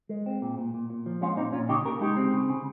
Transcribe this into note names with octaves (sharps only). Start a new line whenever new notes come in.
G#3
C4
A#2
A#2
A#2
A#2
F3
G#3 C#4 F4
A#2 C4 D#4
A#2 C#4 F4
C#3 D#4 G4
C#3 G4 A#4
G#3 D#4 G4
C4
C#3
C#3